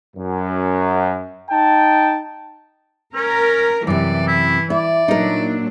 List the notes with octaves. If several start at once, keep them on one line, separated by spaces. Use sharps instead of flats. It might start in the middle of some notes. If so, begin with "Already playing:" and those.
F#2
D#4 G5 A5
C#4 A#4
F#2 C3 E3 D5
E4
E4 D5
A#2 F#3 D4 D#4 A#4